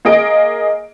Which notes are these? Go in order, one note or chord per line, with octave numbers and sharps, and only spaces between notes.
A#3 G#4 D#5 D7